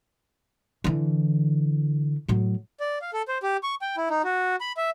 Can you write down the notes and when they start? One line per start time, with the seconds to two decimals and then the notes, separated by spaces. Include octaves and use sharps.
0.84 D3 E3
2.28 A2 F#3
2.80 D5
3.02 F5
3.13 A4
3.28 C5
3.43 G4
3.63 C#6
3.81 G5
3.97 E4
4.10 D#4
4.24 F#4
4.61 B5
4.77 E5